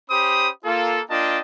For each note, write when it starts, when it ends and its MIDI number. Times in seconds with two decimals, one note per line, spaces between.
0.11 0.49 61
0.11 0.49 67
0.11 0.49 72
0.11 0.49 83
0.11 0.49 87
0.65 1.00 58
0.65 1.00 65
0.65 1.00 69
1.10 1.40 58
1.10 1.40 62
1.10 1.40 65
1.10 1.40 75
1.10 1.40 79
1.10 1.40 81